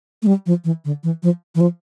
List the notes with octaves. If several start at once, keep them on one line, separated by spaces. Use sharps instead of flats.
A3
G3
F3
E3
D3
E3
F3
E3
F3